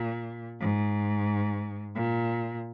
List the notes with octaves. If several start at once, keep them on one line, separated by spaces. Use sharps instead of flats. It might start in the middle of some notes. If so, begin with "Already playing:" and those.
Already playing: A#2
G#2
A#2